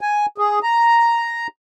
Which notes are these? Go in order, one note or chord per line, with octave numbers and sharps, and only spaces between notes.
G#5
G#4
A#5